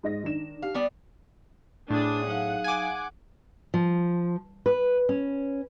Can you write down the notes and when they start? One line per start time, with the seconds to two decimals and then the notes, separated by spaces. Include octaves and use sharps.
0.03 G#2 D#5 A#6
0.24 D#3 D4 E7
0.62 G4 F5
0.74 G3 B3 D5
1.90 A2 D4 G#4 D#6
2.27 F#3 D#4 F5 F#5
2.64 G#5 D6
3.74 F3
4.66 B4
5.09 C#4